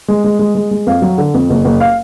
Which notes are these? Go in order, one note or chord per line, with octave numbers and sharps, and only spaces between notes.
G#3
G#3
G#3
G#3
G#3
F2 F5
F#3
D3
F2
F#1
F#1
F5